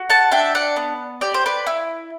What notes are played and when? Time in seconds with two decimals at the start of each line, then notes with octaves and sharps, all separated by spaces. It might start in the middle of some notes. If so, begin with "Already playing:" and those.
Already playing: F#4
0.10 F#5 A5
0.31 D4 E5 G5
0.55 D5 F#5
0.76 B3
1.21 G4 D5
1.34 C5
1.46 B4 D5
1.67 E4